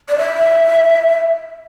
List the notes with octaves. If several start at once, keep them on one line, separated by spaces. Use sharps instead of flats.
D5
E5